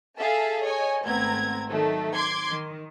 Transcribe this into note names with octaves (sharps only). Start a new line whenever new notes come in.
G#4 A4 E5 F5 A5
C#5 D#5 G#5
G#1 A3 B3 C4 A#5 G#6
D#3 F#3 A3
C6 D6 G#6
D#3